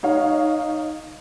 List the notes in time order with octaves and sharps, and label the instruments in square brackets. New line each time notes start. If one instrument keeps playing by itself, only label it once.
[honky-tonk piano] D#4 C#5 F5